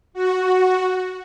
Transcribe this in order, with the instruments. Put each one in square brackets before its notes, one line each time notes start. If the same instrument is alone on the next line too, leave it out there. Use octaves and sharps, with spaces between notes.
[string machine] F#4